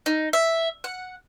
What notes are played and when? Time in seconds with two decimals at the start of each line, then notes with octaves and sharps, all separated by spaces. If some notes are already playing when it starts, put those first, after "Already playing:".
0.06 D#4
0.33 E5
0.84 F#5